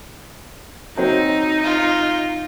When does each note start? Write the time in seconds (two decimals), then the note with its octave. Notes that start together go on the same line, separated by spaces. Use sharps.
0.97 F#3 C4 D#4
1.64 F4